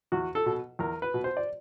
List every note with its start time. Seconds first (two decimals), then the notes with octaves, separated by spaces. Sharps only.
0.12 E2 F#4
0.35 A4
0.46 B2
0.79 E2 A#4
1.02 B4
1.14 B2
1.24 C5
1.37 D5